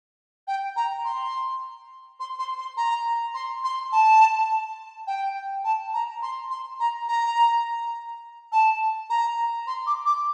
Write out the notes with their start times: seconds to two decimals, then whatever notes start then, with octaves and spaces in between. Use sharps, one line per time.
0.48 G5
0.76 A#5
1.05 C6
2.20 C6
2.39 C6
2.58 C6
2.77 A#5
3.34 C6
3.64 C6
3.92 A5
5.07 G5
5.64 A5
5.93 A#5
6.22 C6
6.50 C6
6.80 A#5
7.08 A#5
8.52 A5
9.10 A#5
9.67 C6
9.87 D6
10.06 D6